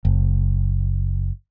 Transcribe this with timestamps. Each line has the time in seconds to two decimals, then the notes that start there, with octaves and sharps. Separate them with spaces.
0.05 F#1